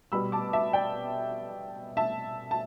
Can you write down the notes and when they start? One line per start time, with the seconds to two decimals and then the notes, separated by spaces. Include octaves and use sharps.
0.12 B2 G3 B5 E6
0.32 A5 D6
0.53 E5 A5
0.73 D5 G5
1.97 E5 A5
2.51 A5